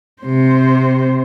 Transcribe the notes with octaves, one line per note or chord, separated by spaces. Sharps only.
C3 C5